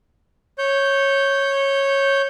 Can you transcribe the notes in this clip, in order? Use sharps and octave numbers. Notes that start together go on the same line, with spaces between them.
C#5 G6